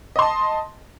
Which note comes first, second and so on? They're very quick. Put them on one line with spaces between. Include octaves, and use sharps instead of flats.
D#5 C6 A5